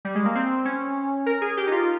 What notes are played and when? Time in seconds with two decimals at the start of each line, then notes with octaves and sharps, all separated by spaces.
0.05 G3
0.15 G#3
0.25 A#3
0.35 C4
0.65 C#4
1.26 A#4
1.41 G#4
1.57 G4
1.67 D#4
1.72 F4